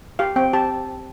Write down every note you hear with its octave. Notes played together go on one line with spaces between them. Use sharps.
G4 F5
C4 G5
G4 A5